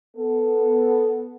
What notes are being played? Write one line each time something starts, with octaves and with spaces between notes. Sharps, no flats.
B3 A4